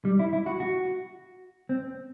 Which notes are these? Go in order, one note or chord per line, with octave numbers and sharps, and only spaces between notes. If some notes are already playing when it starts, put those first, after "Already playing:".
G3
E4
E4
F#4
F#4
C4